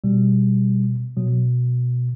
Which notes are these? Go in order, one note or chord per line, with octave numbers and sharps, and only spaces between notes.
B2 G3
B2 F#3